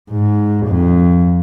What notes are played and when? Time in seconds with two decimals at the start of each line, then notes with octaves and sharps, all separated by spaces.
0.10 G#2
0.67 F2